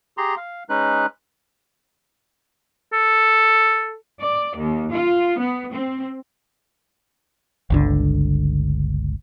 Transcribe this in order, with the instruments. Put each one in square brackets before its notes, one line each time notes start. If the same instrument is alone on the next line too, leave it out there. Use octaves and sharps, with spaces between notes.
[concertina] G4 G#4 A#5 C6
F5
G#3 C#4 D#4 B4 F#6
[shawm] A4
[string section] D5
D#2
F4
B3
C4
[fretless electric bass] G1 C#2 D3